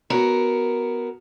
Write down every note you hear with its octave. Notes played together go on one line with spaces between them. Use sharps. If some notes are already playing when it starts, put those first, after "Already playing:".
B3 F#4 A#4 C#5